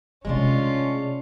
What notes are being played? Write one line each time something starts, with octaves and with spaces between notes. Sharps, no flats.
C3 G#3 A3 C#4 D4 F4